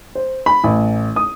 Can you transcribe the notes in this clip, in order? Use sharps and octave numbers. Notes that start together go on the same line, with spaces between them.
C5
B5
A1
D#6